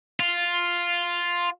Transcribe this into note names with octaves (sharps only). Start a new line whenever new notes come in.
F4